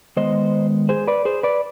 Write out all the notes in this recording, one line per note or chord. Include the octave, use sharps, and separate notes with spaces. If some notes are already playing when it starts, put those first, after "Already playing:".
D#3 G#3 B3 C5 D#5
G#4 C5
B4 D5
G#4 C5
B4 D5